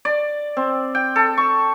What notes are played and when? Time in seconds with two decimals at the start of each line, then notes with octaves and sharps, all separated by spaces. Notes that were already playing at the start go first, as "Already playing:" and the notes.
0.05 D5
0.57 C4
0.95 G5
1.16 A4
1.38 C#6